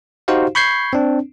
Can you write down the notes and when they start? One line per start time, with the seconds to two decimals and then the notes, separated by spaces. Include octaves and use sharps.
0.28 D#4 F#4 G4 C5 F5
0.55 B5 C#6 G6 G#6 C7
0.93 C4 D4